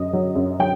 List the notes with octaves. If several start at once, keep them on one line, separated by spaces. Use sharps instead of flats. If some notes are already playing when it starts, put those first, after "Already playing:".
Already playing: F#2 D#5
F#3
F#2
F#3 G5